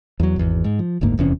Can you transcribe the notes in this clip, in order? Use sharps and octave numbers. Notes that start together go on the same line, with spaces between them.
E2 F#3
G#1 E2
G#2
F3
F#1 D2 G#2 A#3
D#1 E2 C3 C#4